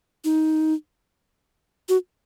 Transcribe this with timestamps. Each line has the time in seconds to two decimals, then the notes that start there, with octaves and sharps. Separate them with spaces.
0.25 D#4
1.89 F#4